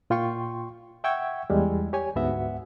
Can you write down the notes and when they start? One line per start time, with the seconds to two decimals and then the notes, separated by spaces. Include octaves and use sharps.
0.10 A#2 F4 G5 C6 C#6
1.04 E5 F#5 G5 C#6 E6 G#6
1.50 E2 G3 G#3
1.93 G4 C#5 G#5
2.16 D2 G#2 B3 F#4 E5 F#5